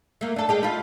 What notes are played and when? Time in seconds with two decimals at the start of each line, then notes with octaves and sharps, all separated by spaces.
0.21 A3 A#3
0.36 D4 A4
0.49 G#3 G4
0.63 F4 B4